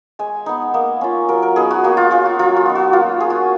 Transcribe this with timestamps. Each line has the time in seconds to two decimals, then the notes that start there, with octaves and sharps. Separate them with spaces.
0.19 G#3 G#5
0.46 B3 D#4
0.74 A#3
1.01 C#4 F4
1.28 F#3 A#4
1.42 A#4
1.56 B3 D#4 G#4
1.71 F#4
1.84 A#3 F#4
1.97 F4
2.11 C#4 F4 F#4
2.26 F#4
2.39 F#3 F4
2.56 F#4
2.66 B3 D#4
2.75 F#4
2.93 A#3 F4
3.20 F4 G#4
3.30 F#4